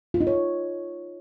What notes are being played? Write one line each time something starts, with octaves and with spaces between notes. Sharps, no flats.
F4
D#4
C#5